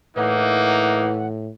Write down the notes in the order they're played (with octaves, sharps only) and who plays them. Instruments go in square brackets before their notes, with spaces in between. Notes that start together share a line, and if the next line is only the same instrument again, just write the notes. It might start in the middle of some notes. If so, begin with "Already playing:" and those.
[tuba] A2 [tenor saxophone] E3 [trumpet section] A#3 D#4 [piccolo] F#5